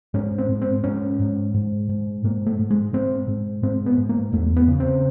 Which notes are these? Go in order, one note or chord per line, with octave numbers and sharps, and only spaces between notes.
G#2 C#4
C4
G#2
C4
G#2 C#4
G#2
G#2
G#2
G#2 A#3
A3
G#2
G#3
G#2 C4
G#2
G#2 C4
B3
G#2
A#3
E2 A3
B3
C#3
C4